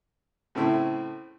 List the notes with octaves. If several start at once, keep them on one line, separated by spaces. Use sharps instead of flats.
A2 C#3 A3 C4 E4